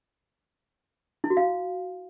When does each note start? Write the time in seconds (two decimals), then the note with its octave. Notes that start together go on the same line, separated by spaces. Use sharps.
1.24 E4
1.30 F#4
1.37 F5